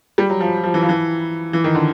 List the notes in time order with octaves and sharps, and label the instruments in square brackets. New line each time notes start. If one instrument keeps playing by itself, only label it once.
[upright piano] G3
F#3
F3
F3
E3
F3
E3
E3
D#3
D3